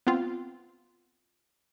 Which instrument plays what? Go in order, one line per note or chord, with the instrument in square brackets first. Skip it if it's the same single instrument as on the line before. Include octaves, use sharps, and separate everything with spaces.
[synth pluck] B3 C4 F4